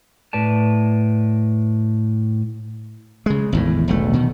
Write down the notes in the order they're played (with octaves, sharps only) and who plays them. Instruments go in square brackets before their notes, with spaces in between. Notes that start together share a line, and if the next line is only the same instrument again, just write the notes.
[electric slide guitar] A2 B4 D5 A5
[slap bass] C#3 G#3
G#1 E2 A2
E1 B1 A3
B2 D#3